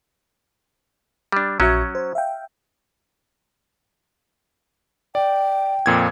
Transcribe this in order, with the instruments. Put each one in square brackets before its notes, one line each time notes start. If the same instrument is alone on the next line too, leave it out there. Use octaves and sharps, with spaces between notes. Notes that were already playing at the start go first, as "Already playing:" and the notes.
[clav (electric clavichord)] G3 D4
[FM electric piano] A#1 F#4 E5 [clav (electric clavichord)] F#3 C#4
[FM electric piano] C5
E5 F5 G5
[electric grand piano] D5 [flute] G5
[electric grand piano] F2 A#2 G#6